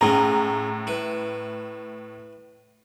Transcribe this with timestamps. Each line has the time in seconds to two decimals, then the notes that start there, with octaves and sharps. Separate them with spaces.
0.01 A2 C#4 F4 G#4 A#5
0.87 E4 B4